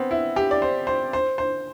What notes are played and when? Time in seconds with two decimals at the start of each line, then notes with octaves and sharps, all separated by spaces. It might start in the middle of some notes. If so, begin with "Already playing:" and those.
Already playing: B3 C4
0.11 E4
0.36 G4
0.51 D5
0.62 C5
0.87 C5
1.13 C5
1.38 C5